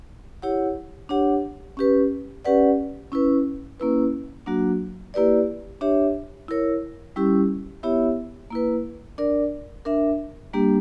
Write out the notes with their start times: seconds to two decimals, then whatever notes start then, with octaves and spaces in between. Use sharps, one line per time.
0.42 E4 G4 C#5 F#5
1.09 D4 G4 C#5 F#5
1.77 C#4 G4 B4
2.45 C#4 G4 B4 D5 F#5
3.12 C#4 E4 B4
3.80 A#3 C#4 E4 B4
4.46 F#3 A#3 D4 F#4
5.14 A#3 E4 G4 B4 D5
5.81 D4 G4 C#5 E5
6.48 E4 A#4 C#5
7.16 G3 C#4 E4 G4
7.83 B3 E4 G4 C#5 E5
8.51 A#3 E4 B4
9.18 D4 A#4 D5
9.85 D4 A#4 E5
10.53 G3 A#3 D4 G4